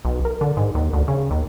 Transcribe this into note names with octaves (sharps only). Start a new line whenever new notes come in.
B1
A#4
D3
G#2
D#2
D2
C#3
D#2